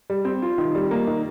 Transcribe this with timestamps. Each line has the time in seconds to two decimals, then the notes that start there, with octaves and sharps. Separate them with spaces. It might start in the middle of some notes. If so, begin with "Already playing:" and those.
0.10 G3
0.25 C4
0.42 F4
0.58 D#3
0.75 G3
0.91 A#3
1.07 D#3